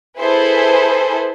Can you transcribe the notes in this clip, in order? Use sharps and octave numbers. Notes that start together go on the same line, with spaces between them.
E4 G#4 A4 B4 C5